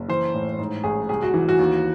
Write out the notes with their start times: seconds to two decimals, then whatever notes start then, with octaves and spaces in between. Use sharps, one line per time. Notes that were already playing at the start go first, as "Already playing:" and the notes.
Already playing: F#1
0.08 E3 C5
0.34 A2
0.58 G#2
0.84 A1 G#4
1.09 C2 G#4
1.23 F#4
1.34 E3
1.49 F#4
1.59 D#2